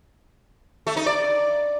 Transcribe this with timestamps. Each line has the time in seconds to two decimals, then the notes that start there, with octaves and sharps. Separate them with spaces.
0.87 A3
0.96 D#4
1.06 D5